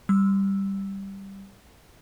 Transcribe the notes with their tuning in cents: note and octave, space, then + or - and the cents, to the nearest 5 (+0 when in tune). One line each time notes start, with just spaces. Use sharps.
G3 +0 E6 +0